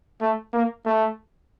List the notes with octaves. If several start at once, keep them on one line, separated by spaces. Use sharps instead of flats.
A3
A#3
A3